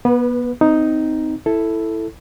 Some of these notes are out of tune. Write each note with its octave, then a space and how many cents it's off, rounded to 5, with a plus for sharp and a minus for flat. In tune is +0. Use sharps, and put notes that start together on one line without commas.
B3 -30 B4 +0
C4 -25 D#4 +0
E4 +0 A4 +0